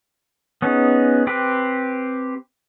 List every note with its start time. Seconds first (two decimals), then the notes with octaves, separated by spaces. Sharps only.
0.62 B3 C#4 D#4 G#4
1.27 C4 G4 B4